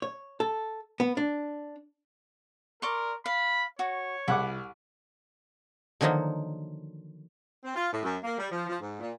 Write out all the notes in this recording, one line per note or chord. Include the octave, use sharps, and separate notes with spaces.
C#5
A4
B3
D4
A#4 D5 C6 C#6
F5 B5
F#4 C#5
C2 E4 F#5 D6
D3 D#3 F3 F#3 A#3 D#4
C4
F4
A2
F#2
A#3
G3
F3
F3
G#2
A#2